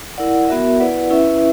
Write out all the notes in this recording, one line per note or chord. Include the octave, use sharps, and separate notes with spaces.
E4 A#4 D5 F#5
B3 F#4 A#4 E5
E4 B4 D5 F#5
C#4 E4 B4 E5